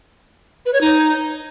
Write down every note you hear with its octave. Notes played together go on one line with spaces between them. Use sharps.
B4
C#5
D#4